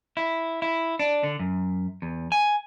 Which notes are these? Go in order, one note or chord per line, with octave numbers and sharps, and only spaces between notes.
E4
E4
D4
D3
F#2
E2
G#5